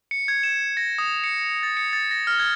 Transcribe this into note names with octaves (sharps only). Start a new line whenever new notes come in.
C#7
G#6
E7
A#6
D#6
C#7
A6
C#7
A6
A#6
F6
G#6